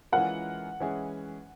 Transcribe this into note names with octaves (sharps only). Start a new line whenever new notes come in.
E3 G#3 C#4 F4 A#4 F#5
E3 G#3 C#4 E4 G#4